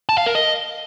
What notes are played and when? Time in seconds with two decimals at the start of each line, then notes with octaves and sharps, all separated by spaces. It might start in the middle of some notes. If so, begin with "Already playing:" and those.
0.09 A5
0.18 F5
0.26 A#4
0.35 D#5